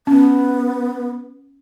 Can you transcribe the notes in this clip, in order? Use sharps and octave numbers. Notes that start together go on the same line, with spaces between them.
B3 C#4